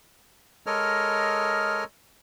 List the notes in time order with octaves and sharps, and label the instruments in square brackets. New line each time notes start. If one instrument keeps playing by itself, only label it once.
[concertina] G#3 A4 A#4 C#5 D#5 F6